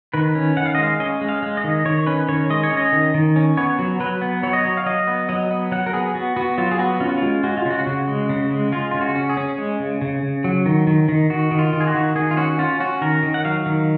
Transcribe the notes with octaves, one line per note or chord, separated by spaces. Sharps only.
D#3 B4
C#4
D#3 F#5
F5
D#5
G#3 F5
C#4 D#5
G#3
F5
G#3
D#5
D#3
D#3 C#5
C#4 B4
D#3 C#5
G#3 D#5
C#5
C#4
D#5
D#3
D#3
C#4
B3 C#5
F#3
F#3 B4
B3
F#3 C#5
D#5
F#3 C#5
F5
F#3 D#5
B3
F#3 D#5
B3
F#3 F#5
A#4
B3 G#4
B3 F#4
B3 F#4
F#3 F4
G#4
B3 F#4
C#4 F4
F#4
G#3 F4
G#3 F#4
F4
C#3 F#4
C#3
G#3
C#3
G#3
G#3 F4
C#3 F4
F#4
C#4
G#4
C#4
G#3
C#3
C#3
C#3
F#3
D#3
D#3
D#3
D#3 F#4
D#3
F4
D#3
G#4
F#4
D#3
D#3 G#4
F4
C#4 F#4
C#4 F4
C#4 F#4
D#3 A#4
D#3
F#5
F#3 F5
D#3